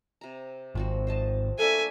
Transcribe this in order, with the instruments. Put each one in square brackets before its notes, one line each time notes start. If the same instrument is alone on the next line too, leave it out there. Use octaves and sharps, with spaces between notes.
[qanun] C3 A#5
[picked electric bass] G#1 [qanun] F3 C4 F#4
[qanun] C5 D#5 A5
[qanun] A3 A#3 D4 [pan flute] A4 [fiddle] E5 G#5